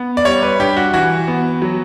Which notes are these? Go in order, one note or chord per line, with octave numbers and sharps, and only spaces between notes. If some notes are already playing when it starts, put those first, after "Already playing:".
Already playing: B3
D5
G3 C#5
B4
G2 G4
F#4
E3 F#4
B3
F#3